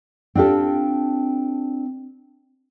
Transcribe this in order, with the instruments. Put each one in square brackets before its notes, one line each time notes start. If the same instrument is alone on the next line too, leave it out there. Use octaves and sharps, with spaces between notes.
[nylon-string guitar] C4 D4 F4 G4 A4